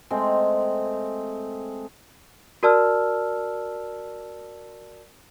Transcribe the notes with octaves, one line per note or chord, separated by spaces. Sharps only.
G#3 A3 C4 G5
F#4 A#4 D5 A5 E6 F6